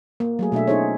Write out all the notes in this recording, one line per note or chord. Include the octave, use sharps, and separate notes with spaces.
A#3
F#3 A3 G#4
B2 A3 D4 E5
C#4 D#4 F4 G#4 C5 C#5